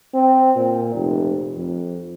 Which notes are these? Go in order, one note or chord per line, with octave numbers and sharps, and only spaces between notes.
C4
A#2
F1
F2